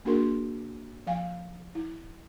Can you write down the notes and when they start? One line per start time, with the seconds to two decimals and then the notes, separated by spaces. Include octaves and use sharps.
0.05 A#3 D4 F#4 G#4 A#4 C6
1.07 F3 F5 G#5
1.75 E4